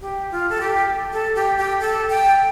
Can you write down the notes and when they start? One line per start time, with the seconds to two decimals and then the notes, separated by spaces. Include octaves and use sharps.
0.01 G4
0.31 F4
0.49 A4
0.61 G4
1.13 A4
1.36 G4
1.58 G4
1.80 A4
2.10 G5